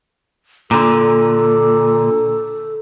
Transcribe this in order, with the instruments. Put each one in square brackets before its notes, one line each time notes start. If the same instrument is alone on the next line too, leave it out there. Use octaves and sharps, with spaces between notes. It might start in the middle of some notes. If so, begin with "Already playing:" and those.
[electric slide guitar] A#2 D3 [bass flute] A4